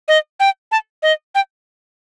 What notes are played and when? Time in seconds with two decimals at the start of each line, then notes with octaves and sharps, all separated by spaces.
0.08 D#5
0.40 G5
0.72 A5
1.03 D#5
1.35 G5